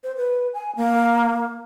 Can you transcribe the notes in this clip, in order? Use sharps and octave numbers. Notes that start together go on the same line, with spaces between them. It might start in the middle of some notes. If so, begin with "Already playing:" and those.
C5
B4
G#5
A#3